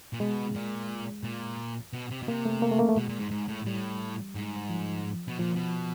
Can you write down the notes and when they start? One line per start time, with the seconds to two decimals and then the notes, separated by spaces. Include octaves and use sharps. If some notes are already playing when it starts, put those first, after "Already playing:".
0.13 A#2
0.20 B2 G#3
0.55 A#2
1.23 A#2
1.93 B2
2.11 C3
2.23 B2
2.28 C3 A#3
2.45 A3
2.62 A#3
2.72 A3
2.79 A#3
2.89 A3
2.97 B2 G#3
3.09 A#2
3.19 G#2
3.31 G#2
3.48 A2
3.66 A2 G3
4.35 G#2
4.69 F3
5.28 B2
5.39 A#2 F3
5.56 B2